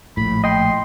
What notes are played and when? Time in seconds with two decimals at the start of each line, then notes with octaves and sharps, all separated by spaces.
0.17 A#1 A2 B5
0.44 D#5 G5 C6